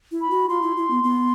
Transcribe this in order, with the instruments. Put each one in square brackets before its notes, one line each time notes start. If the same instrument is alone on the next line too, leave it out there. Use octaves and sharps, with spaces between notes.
[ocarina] E4
[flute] B5
[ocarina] F#4
[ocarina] F4 [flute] C6
[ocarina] E4
E4
B3
B3